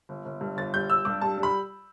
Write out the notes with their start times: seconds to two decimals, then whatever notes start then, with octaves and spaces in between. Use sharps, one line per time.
0.09 G1
0.25 G1
0.41 G2
0.57 G1 A6
0.73 G3 G6
0.90 G3 E6
1.05 G2 D6
1.21 G3 A5
1.37 G3
1.43 B5